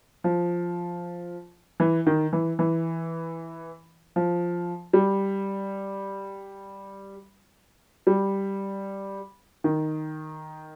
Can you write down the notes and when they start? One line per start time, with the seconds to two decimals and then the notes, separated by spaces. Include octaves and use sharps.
0.24 F3
1.80 E3
2.07 D#3
2.33 E3
2.59 E3
4.16 F3
4.93 G3
8.07 G3
9.64 D#3